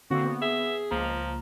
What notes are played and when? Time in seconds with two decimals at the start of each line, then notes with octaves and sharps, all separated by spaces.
0.10 D3 A#3 C4 F#4
0.24 B3
0.42 G#4 E5
0.91 C#2 F3 A#3 A#5